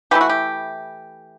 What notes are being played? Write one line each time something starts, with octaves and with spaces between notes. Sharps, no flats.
E3 A3 E4 G4
F#4
G4